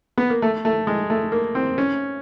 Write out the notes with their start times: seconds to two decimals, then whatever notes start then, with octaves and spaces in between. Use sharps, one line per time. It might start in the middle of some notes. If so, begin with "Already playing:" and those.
0.18 B3
0.30 A#3
0.42 A3
0.65 A3
0.87 G#3
1.10 A3
1.32 A#3
1.55 C4
1.78 C#4